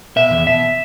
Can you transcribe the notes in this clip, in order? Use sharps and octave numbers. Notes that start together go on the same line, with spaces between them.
B2 E5
E2
B2 E5